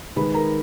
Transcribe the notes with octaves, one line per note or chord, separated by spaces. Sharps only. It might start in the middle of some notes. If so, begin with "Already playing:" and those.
D#3 G#3 D#4 B4 B5
A#4 A#5